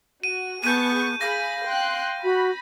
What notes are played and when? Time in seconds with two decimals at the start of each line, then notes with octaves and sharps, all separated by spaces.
0.24 F#4 D#7
0.64 B3 G#4 A5 C#6 G6 D#7
1.21 G#4 F5 B5 A#6
1.66 G5 C6 F#6
2.24 F#4 B5